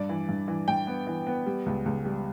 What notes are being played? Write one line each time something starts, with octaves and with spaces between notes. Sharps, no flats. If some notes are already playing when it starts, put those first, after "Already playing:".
Already playing: G2 D5
E3
G2
E3
G2 G5
B3
E3
B3
G3
C#2
C#2
G3